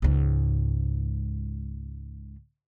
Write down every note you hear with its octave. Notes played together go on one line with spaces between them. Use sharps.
C#2 G#2